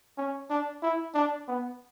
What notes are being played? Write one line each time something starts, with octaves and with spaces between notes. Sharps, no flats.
C#4
D4
E4
D4
B3